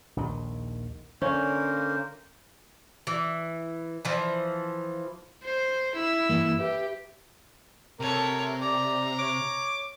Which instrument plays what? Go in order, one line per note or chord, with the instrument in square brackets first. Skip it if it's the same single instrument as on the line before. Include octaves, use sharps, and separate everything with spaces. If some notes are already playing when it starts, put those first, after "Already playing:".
[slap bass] A#1 D#2 D#3
[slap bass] D3 [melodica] A#3 A#4 C5 [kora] C#4
[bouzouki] E3
E3 F3
[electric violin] C5
E4 E6
[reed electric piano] G2 E3 A#3
[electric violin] G4 [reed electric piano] B4 E5
[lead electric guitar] C3 [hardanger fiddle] A3 C#5 [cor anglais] A#4
[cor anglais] D5 [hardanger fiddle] A#5
[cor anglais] C#5 [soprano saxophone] D6